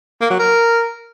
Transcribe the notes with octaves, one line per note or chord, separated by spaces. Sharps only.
A#3
F#3
A#4